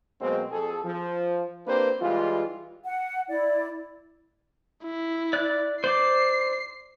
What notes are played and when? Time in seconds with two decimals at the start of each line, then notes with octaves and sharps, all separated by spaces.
0.21 B2 F#3 G#3 A#3 C4
0.52 F2 G#4 A4
0.84 F3
1.67 A#3 C4 D4 G4 B4 C5
2.01 E3 G3 G#3 F4
2.85 F#5
3.29 E4 D5
4.83 E4
5.33 D5 F#6
5.84 C5 D5 D6 C7